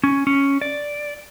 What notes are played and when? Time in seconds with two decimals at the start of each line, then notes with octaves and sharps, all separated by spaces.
0.04 C#4
0.27 C#4
0.62 D5